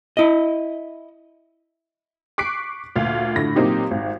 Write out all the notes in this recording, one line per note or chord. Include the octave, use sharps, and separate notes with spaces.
E4 D#5
C#6 D6 F#6 B6 C7 D7
D2 A#2 F4 F5
A2 D3 A#6
A#2 F#3 A#3 C4 D#4 G4
G#1 G#2